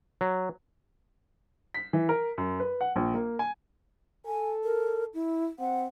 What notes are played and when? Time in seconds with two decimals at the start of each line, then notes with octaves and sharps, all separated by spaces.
0.21 F#3
1.74 B6
1.93 E3
2.09 A#4
2.38 F#2
2.60 B4
2.81 F#5
2.96 A#1
3.14 A#3
3.39 G#5
4.26 A4 G#5
4.64 A#4
5.14 E4
5.59 C4 F#5